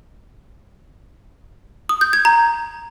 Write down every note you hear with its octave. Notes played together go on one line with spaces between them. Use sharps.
D#6
G6
G#6
A#5